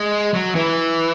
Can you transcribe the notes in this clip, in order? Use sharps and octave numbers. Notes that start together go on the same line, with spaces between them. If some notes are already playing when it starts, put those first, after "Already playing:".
Already playing: G#3
F#3
E3